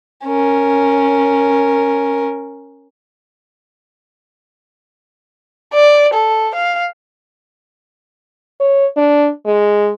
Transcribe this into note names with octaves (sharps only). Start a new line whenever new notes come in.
C#4 A#4
D5
A4
F5
C#5
D4
G#3